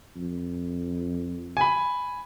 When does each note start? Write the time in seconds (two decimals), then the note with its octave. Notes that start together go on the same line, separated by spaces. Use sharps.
0.16 F2
1.57 G#5 B5